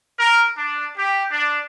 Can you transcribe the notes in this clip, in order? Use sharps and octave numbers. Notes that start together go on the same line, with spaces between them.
A#4
D4
G4
D4